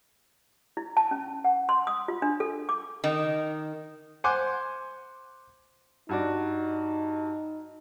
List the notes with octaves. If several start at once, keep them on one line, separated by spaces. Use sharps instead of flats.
E4
A5
C#4
F#5
C6
D#6
F4
D4
A4
D6
D#3
C5 F#5 G#5 C6 D6
G2 D#4 F#4 D5